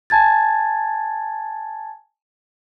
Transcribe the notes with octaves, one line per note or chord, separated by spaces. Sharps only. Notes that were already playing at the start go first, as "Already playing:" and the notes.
G#5 A5 G#6 A6